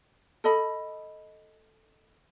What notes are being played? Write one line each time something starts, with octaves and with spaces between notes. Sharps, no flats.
A4 D#5 B5